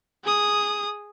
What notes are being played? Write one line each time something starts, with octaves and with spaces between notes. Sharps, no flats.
G#4 D#6